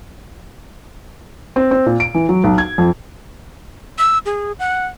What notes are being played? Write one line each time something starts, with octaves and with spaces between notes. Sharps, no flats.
C4
C4
A#2
D7
E3
F#3
B1
G#6
F2
E6
G#4
F#5